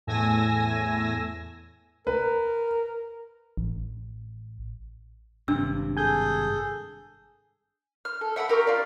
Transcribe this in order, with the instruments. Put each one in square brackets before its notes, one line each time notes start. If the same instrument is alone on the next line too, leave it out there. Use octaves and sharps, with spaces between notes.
[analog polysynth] E2 A2 G#5 E6 A#6
[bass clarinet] A#4 [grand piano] B4
[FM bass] A1
[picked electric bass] G#1 G2 C3 [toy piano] D4 E6
[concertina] G#4 A4 [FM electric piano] G#5 G6
[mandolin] F6
A4
E5 F#5 G5 B5
G4 A#4 A#5 C#6
F4 D5